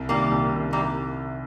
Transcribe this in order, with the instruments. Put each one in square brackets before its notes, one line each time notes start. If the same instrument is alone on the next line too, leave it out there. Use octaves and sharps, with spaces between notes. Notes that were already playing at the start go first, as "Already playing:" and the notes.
Already playing: [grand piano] C2
[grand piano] C3 D#3 [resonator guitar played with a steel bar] G3 A#3
[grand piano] C2
C3 D#3
[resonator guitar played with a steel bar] G3 A#3